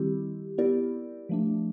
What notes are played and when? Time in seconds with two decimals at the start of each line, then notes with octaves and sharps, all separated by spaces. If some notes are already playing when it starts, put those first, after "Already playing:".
Already playing: D#3 G3 C4 E4 G4
0.58 B3 E4 G4 A#4 D5
1.29 F3 A3 D4